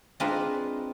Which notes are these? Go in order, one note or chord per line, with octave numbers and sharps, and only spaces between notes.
G#3 C4 D4 D#4 F4 B4